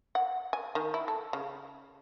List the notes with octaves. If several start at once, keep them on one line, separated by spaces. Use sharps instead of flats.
F#5
G#5
D#3
E4
A4
C#3